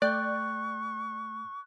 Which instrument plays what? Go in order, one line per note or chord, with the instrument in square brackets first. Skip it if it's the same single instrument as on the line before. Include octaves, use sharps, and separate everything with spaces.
[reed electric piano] A3 G5 G6 [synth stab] D5 [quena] C#6 [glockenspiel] F#6